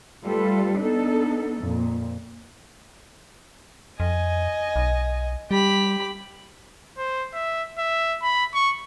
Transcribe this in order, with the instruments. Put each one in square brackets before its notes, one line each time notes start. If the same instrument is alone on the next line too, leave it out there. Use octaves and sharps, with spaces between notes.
[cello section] G3 A3 F4 A4 B4
B3 D4 D#4 A4
F2 A#2
[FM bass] F2 [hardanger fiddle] D#5 G#5
[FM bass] B1
[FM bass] G3 [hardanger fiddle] G4 B5
[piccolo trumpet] C5
E5
E5
B5
C#6